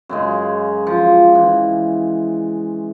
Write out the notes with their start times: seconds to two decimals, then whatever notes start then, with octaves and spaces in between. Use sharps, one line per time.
0.09 F#2 C#3 G#3
0.87 F3
1.35 E3